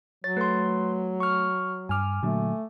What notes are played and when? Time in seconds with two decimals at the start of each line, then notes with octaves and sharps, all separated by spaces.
0.24 F#3 C#5 A6
0.37 A3 B4 C6
1.20 C#6 F6
1.89 G2 G#5 D6 F6
2.23 A#2 D3 F#3 A3